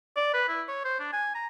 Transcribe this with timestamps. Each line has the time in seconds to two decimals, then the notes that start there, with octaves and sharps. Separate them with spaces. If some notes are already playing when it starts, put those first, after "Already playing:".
0.16 D5
0.34 B4
0.49 E4
0.68 C#5
0.85 C5
0.99 D4
1.13 G#5
1.35 A#5